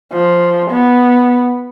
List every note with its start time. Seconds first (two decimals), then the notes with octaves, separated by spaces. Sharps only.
0.12 F3
0.70 B3